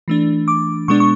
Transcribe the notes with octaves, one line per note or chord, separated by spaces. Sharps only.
E3 A3 D4
D6
B2 G#3 B3 D4 C#6
C#6